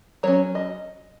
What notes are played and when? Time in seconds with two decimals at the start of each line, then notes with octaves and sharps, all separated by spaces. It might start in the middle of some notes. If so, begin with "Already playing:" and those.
0.23 F#3 C#4 C#5
0.55 D#5